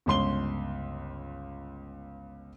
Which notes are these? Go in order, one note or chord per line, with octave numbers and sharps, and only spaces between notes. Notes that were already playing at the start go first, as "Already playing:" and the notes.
G1 C#2 C6 G7